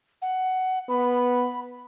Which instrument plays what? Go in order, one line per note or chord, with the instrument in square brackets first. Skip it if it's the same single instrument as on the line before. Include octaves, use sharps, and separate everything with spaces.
[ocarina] F#5
[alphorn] B3 [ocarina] B5